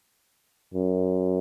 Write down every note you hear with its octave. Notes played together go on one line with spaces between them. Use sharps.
F#2